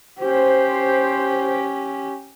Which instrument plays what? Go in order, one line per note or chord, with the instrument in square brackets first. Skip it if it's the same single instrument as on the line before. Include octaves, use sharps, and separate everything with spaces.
[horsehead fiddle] C#4 G4 [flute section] C5